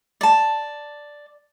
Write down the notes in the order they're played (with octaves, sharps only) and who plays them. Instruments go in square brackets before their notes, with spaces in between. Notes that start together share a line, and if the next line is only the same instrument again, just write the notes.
[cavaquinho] D5 A5